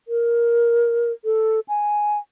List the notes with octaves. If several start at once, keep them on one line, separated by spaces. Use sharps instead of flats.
A#4
A4
G#5